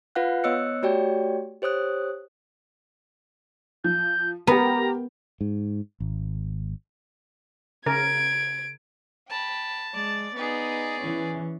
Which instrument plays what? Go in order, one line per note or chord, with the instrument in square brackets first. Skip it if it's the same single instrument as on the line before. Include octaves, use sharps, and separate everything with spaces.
[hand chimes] F4 B4 F5 F#5 F#6
B3 C#5 D#5 E6 F#6 C#7
A3 F#4 G4 C#5 D5 G5
G4 C5 C#5 D#6 F#6
[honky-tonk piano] F3 [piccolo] G6
[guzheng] B3 [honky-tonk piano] G4 A#4 [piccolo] A#5
[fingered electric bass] G#2
G#1
[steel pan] C#3 A#4 [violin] G#6 D7
[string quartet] G5 B5 [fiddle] A5
[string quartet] G#3 D5 A6
[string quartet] B3 D#4 [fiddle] G#4 D5
[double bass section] E3 [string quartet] C#4